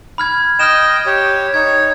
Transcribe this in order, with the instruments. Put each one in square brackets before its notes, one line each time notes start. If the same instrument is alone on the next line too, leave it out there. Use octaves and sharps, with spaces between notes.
[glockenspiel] B5 F6 G#6
[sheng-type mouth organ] D#5 G5 [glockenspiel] F6 E7
[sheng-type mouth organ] G4 C#5
[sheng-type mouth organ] D#4 C#5 [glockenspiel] G#6